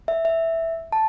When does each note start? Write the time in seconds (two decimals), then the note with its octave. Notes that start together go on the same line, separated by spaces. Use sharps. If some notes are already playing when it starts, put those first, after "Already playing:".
0.08 E5
0.25 E5
0.92 A5